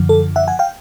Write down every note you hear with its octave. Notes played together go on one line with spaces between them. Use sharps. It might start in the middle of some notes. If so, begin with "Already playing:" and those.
Already playing: F#2 D3 F3
A4
E5 F#5
F#5 G#5
F5 G5